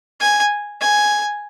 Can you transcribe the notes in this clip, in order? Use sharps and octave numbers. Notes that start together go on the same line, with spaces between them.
G#5
G#5